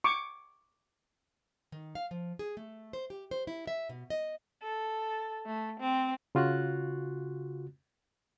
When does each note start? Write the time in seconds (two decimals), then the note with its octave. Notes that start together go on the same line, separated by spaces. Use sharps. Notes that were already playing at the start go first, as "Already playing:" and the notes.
0.04 C#6 D6
1.72 D#3
1.95 F5
2.11 F3
2.39 G#4
2.57 A3
2.93 C5
3.10 G4
3.31 C5
3.47 E4
3.67 E5
3.89 B2
4.10 D#5
4.62 A4
5.46 A3
5.80 C4
6.35 C#3 F4 F#4 F#6